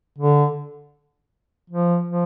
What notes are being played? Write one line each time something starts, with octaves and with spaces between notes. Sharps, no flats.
D3
F3
F3